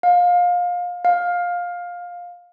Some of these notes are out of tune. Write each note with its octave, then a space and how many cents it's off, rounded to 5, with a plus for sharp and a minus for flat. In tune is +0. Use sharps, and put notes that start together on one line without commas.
F5 +25
F5 +15